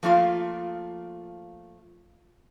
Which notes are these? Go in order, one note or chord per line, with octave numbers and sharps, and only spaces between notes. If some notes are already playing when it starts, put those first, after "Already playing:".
F3 A3 A#3 F4 F5